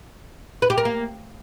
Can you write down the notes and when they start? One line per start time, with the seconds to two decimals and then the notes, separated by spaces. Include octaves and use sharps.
0.62 B4
0.70 G4
0.78 A#4
0.85 A#3